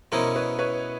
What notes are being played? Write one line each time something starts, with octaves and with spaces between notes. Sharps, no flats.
B2 G#3 C#4 E4 A#4 C5
B4 C#5
B4 C#5